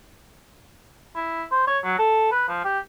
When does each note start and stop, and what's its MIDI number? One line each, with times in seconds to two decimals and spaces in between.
1.16 1.44 64
1.51 1.66 72
1.67 1.79 73
1.84 1.95 54
1.99 2.31 69
2.32 2.44 71
2.48 2.62 53
2.65 2.80 67